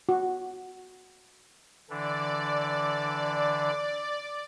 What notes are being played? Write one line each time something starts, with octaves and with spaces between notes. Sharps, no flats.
F#4
D3 E3 D4 D5